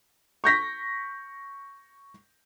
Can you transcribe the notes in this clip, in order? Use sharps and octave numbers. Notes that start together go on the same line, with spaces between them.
C#6 G6 A#6 B6